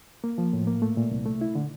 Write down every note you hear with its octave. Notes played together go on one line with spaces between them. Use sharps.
A#3
F3
A2
A#3
A3
A#2
C2
A3
E4
D3